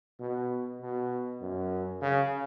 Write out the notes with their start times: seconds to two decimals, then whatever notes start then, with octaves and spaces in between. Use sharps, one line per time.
0.20 B2
0.81 B2
1.41 F#2
2.02 C#3